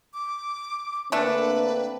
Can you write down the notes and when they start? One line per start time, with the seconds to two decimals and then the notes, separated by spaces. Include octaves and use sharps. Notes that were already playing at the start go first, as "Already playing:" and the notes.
0.14 D6
1.12 D3 A3 A#3 C4 D4 B4